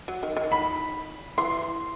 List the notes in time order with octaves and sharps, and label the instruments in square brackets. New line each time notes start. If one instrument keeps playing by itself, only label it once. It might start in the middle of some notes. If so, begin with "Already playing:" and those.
[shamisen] F#3
D#3
D#3
[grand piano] B5
[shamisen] E3 [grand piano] C6